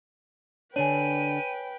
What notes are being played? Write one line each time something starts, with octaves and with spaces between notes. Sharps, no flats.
D3 D4 B4 C#5 G5 G#5 D#7